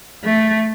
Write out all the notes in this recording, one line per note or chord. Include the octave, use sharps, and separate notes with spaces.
A3